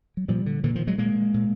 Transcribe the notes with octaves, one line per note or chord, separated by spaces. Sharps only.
F#3
A#2 F3 G3
D3
A#2 D3 E3
D#3 F3
F#3 G#3
A#2 G#3 A#3
A#2